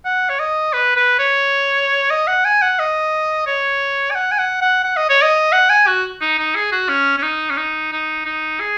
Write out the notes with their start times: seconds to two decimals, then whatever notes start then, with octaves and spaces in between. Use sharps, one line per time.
0.05 F#5
0.29 C#5
0.39 D#5
0.73 B4
0.96 B4
1.19 C#5
2.10 D#5
2.27 F#5
2.45 G#5
2.62 F#5
2.79 D#5
3.47 C#5
4.11 G#5
4.15 F#5
4.32 G#5
4.39 F#5
4.61 F#5
4.84 F#5
4.97 D#5
5.10 C#5
5.22 D#5
5.53 F#5
5.70 G#5
5.87 F#4
6.21 D#4
6.38 D#4
6.55 G#4
6.72 F#4
6.89 C#4
7.18 C#4
7.23 D#4
7.51 C#4
7.57 D#4
7.92 D#4
8.26 D#4
8.60 G#4